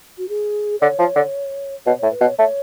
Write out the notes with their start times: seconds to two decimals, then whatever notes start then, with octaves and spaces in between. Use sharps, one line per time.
0.18 F#4
0.29 G#4
0.81 D3 C#5
0.99 F3
1.15 D3
1.86 B2 C#5
1.99 A2 C#5
2.12 B4
2.21 B2
2.25 C#5
2.38 A3 C#5